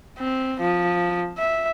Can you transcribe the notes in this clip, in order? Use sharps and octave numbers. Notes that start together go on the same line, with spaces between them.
C4
F3
E5